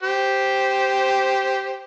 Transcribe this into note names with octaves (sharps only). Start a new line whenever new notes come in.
G4 C5